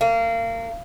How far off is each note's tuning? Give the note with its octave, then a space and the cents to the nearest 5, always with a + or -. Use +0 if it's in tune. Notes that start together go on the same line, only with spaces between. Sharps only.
A#3 -30